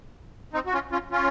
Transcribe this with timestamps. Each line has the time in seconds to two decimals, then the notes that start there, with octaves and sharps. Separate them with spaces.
0.53 C4 D#4
0.66 F#4
0.73 C#4 F4
0.92 C#4 F4
1.11 C#4 F4